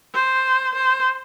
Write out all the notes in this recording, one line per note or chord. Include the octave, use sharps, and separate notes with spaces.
C5
C5